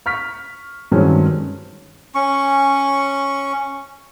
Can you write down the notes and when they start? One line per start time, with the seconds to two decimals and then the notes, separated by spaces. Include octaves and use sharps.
0.06 C#6 F6 B6
0.92 G2 D#3 F#3 G#3 C4 C#4
2.15 C#4 C#6